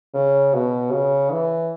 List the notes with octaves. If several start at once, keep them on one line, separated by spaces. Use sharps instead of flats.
C#3
B2
C#3
E3